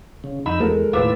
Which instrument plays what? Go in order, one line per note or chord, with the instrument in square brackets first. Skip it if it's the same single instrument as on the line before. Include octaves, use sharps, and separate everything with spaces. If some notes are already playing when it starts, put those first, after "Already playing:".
[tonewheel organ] C#3
[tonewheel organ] F2 D#4 E6 [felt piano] B5
[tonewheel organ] E2 [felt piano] G#3 A4 A#4
[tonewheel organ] D#2 F4 E6 [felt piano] A2 B4 D6